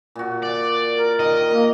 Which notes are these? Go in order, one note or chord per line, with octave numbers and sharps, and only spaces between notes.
A#2 F#4
D5
A#4
D#3 D#5
A#3 A#4